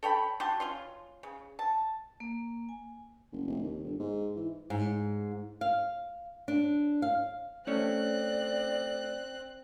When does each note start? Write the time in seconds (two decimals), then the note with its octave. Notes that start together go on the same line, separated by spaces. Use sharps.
0.03 A4 C#5 G5 B5
0.40 F#4 G4 A5 C6
0.60 C#4 F4 C6
1.23 C#3
1.59 A5
2.20 A#3
2.69 G#5
3.32 F#1
3.47 F1
3.63 D#2
3.84 G1
3.99 G#2
4.36 E3
4.70 G#2
5.61 F5
6.48 D4
7.02 F5
7.67 A3 C4 C#4 C#5 D5 F#6